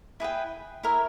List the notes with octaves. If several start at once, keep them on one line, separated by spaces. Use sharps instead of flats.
E4 G#4 B4 G5
E4 A#4 C#5 E5